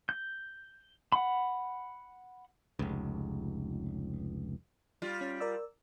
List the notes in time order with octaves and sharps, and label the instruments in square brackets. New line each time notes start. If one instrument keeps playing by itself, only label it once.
[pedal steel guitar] G6
F#5 B5
[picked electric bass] F1 C#2
[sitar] G3 F4
[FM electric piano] C#4
A#4 D5 E6